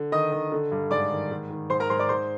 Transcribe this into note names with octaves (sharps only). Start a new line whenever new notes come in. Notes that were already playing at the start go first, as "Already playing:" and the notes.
Already playing: D3
D#3 D#5 D#6
D#3
D3
G2
G#2 D5 D6
D#3
G#2
D#3
G#2 C5 C6
A#4 A#5
G#2 C5 C6
D5 D6
G#2 C5 C6